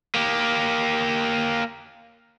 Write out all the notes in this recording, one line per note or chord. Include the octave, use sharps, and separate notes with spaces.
A#3 G4